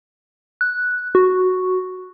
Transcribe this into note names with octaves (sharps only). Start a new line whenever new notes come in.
F#6
F#4